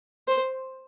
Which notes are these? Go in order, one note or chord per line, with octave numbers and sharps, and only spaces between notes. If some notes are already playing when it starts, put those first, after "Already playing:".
C5